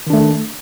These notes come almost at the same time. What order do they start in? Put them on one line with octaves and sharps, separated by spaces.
D#3 D4 A3